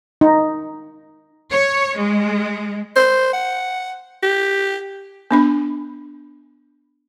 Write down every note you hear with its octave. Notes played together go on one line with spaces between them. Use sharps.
D#4
C#5
G#3
C5
F#5
G4
B3 D4 B5